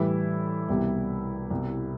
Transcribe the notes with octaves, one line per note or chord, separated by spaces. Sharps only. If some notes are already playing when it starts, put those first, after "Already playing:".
Already playing: A2 E3 G3 E4
C2 B2 G3
C2 B2 G3